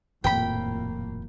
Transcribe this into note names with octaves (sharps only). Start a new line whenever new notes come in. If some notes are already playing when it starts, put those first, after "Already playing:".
D#1 F2 A2 F3 A#3 G5 B5